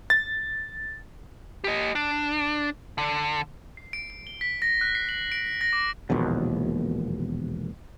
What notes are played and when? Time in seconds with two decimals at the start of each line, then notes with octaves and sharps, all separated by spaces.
0.10 A6
1.64 G4 D#5
1.95 D4
2.98 D3
3.77 C7
3.93 D7
4.10 D7
4.27 G7
4.41 B6
4.62 A#6
4.81 F#6
4.95 C7
5.09 F#7
5.32 D7
5.61 A#6
5.73 D6
6.10 E1 A#1 D#2 B2